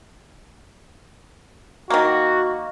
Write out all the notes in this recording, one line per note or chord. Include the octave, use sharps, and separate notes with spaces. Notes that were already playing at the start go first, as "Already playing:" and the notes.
D#3 A#3 F#4